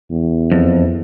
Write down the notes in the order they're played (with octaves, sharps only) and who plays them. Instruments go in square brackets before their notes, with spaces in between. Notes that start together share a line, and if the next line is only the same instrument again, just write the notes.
[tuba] E2
[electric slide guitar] F2